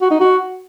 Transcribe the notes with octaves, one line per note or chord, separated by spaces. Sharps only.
F#4
D#4
F#4